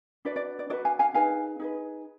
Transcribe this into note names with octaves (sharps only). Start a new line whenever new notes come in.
D4 F#4 B4 D5
D5
D5
D4 F#4 B4 D5
F5 G#5
F5 G#5
D#4 G#4 B4 F5 G#5
D#4 G#4 B4